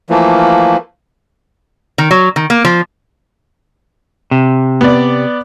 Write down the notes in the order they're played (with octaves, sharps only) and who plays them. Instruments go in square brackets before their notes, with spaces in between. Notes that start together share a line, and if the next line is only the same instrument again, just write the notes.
[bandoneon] E3 F3 A3 A#3
[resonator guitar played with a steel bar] D#3
F#3
D#3
A#3
F3
[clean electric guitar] C3
[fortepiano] B3 D5